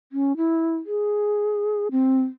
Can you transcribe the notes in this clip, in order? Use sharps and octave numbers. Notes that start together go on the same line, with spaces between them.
C#4
E4
G#4
C4